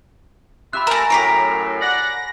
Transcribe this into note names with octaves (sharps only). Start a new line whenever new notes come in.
F4 G4 E5 B5 F#6
A3 A#4 G#5 A#5 E7
F#2 A2 G4 A#4 C#5 B6 C7 D7
D5 F#5 A#6